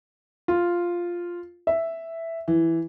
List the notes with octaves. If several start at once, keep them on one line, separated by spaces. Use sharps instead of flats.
F4
E5
E3